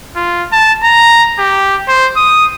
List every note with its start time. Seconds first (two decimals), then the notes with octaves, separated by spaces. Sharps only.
0.16 F4
0.52 A5
0.83 A#5
1.38 G4
1.88 C5
2.17 D#6